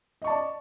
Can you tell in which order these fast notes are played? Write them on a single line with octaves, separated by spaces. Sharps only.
D#5 C#6 A5 D5